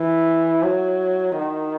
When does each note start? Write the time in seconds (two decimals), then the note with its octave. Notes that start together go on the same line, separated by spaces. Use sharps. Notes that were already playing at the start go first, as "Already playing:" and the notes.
Already playing: E3
0.63 F#3
1.38 D#3